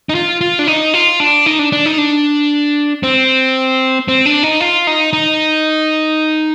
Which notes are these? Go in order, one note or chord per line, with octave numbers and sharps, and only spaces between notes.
D#4
F4
F4
D4
D#4
F4
D4
D#4
D4
D4
D#4
D4
C4
C4
D4
D#4
F4
D#4
D#4